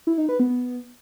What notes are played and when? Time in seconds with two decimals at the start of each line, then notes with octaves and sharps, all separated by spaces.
0.07 E4
0.18 D#4
0.29 B4
0.40 B3